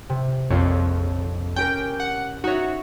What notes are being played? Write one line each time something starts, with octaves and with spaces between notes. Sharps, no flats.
C3
A#1 F2 F4 C#5
C#4 G4 A#4 G5
F#5
D#4 F#4 C#5 E5